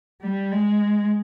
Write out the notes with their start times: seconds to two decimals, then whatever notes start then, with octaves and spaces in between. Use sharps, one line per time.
0.21 G3
0.52 G#3